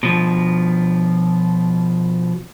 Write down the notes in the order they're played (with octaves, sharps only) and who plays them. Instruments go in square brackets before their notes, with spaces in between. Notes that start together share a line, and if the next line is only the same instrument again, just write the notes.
[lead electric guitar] B2 F3